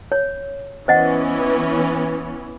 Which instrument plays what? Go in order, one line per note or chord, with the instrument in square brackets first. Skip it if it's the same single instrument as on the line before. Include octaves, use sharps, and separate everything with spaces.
[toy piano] C#5
[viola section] E3 B3 C#4 [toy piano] C5 D#5 F#5